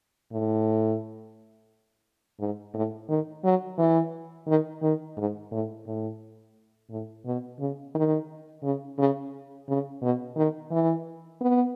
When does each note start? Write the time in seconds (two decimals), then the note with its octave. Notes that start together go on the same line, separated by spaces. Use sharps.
0.32 A2
2.39 G#2
2.74 A2
3.08 D#3
3.44 F#3
3.78 E3
4.47 D#3
4.82 D#3
5.17 G#2
5.51 A2
5.86 A2
6.90 A2
7.25 B2
7.59 C#3
7.95 D#3
8.63 C#3
8.98 C#3
9.68 C#3
10.02 B2
10.36 D#3
10.71 E3
11.41 B3